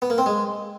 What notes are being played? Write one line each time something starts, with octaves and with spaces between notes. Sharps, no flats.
B3
A#3
C4
G#3